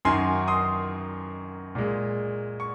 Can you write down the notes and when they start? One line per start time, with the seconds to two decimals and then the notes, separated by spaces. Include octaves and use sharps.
0.05 F#2 D#3 F#3 G#5 C6
0.48 C6 D#6
1.75 A#2 G#3
2.60 C#6